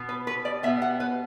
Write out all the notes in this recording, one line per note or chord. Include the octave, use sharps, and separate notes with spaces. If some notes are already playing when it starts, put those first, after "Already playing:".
Already playing: B2 B3
B4
B4
D5
B2 B3 E5
F#5
B4